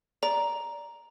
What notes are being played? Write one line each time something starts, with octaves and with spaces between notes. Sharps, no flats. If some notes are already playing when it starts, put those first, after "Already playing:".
D5 A#5